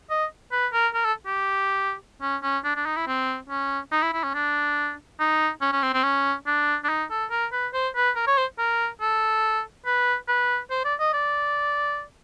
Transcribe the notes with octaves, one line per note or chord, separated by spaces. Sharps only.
D#5
B4
A#4
A#4
A4
G4
C#4
C#4
D4
D4
D#4
E4
C4
C#4
D#4
E4
E4
C#4
D4
D#4
C#4
C#4
C4
C4
C#4
D4
D4
D#4
A4
A#4
B4
C5
B4
A#4
C#5
C5
A#4
A4
B4
B4
C5
D5
D#5
D5